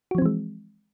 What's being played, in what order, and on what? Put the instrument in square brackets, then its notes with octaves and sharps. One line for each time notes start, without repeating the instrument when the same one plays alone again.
[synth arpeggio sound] F#4
F3
C4
E3
G#3